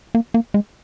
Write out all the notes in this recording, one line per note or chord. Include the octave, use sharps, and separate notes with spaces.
A#3
A#3
G#3